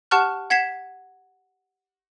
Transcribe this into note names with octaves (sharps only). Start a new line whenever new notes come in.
G4 F#5 A5 C#6 F6 F#6
F#5 G#6 B6 C7 E7